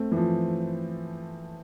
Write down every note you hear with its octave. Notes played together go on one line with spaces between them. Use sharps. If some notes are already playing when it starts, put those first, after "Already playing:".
Already playing: A3 C4
E3
F3